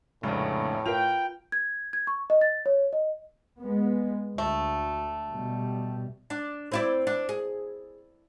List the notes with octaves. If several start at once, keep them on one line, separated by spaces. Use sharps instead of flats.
F1 A#1 A2 C#3 G#3 D4
F4 A#4 B4 G5 F7
G#6
G#6
C#6
D#5
A6
C#5
D#5
G#3 B3
D2 A3
B2 G3
D4
C4 E4 D5
D4
G#4